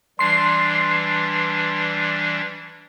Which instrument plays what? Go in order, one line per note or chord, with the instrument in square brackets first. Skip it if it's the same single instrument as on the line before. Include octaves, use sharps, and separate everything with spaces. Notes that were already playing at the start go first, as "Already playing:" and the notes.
[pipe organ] E3 G3 D4 [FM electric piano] C6 C7